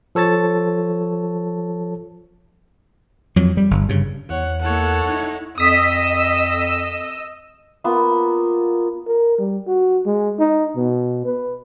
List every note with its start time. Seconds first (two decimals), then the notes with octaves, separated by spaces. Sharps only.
0.15 F3 A4 C#5 A5 A6
3.36 F2 F#3
3.57 G3
3.71 G1
3.89 G2 C#3
4.30 E2 C#5 F#5
4.62 A#3 E4 A4 C#5 F#5
5.06 D#4 E4
5.58 F2 D#5 D#6 E6 B6
7.84 A#3 B3 F4
9.07 A#4
9.38 G3
9.67 F#4
10.06 G#3
10.39 D#4
10.76 B2
11.26 B4